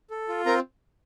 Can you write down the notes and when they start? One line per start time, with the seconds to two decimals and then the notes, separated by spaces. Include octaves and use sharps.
0.11 A4
0.29 F4
0.46 C4 A#4 A#5